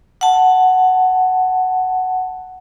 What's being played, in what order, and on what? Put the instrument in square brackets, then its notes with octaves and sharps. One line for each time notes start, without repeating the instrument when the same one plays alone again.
[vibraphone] F#5 A5